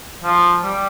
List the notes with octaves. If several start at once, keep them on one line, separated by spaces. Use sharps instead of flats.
F3
G3